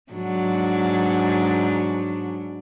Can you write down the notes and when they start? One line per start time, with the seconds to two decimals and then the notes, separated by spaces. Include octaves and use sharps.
0.12 G#2 F#3 D4